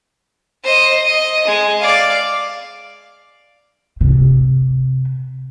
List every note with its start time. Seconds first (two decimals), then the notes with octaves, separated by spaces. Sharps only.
0.64 C5 D#5
1.06 D#5
1.47 G#3
1.80 D5 F5
4.01 C3